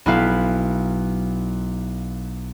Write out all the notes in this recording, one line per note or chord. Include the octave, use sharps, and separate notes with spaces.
B1 B3 E4 B4 F5